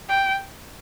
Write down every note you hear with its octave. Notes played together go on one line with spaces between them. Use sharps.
G5